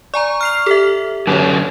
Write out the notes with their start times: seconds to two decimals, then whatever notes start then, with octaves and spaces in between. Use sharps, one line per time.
0.14 D5 G#5 A#5 C#6
0.41 F6 C7 F7
0.66 G4 A4 E5
1.27 F#2 D3 F#3 C#5